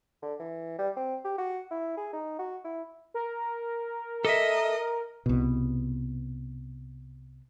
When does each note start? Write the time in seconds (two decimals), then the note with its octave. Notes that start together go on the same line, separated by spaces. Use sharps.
0.23 D3
0.40 E3
0.79 G3
0.96 C4
1.25 G4
1.38 F#4
1.71 E4
1.97 G#4
2.13 D#4
2.39 F#4
2.64 E4
3.14 A#4
4.25 A4 D#5 E5
5.26 C2 B2